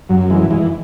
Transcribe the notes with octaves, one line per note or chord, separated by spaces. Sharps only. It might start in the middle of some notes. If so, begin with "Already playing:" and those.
F#2 F#3
E3 G#3
E3 G#3